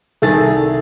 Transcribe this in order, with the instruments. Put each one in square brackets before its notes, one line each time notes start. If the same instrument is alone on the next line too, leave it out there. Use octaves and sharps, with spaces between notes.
[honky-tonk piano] C2 A4 [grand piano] D#3 G#4 A6